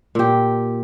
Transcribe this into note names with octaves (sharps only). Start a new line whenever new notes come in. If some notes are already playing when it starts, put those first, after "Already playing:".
A#2 G4